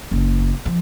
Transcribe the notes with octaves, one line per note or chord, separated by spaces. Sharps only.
F#1
F3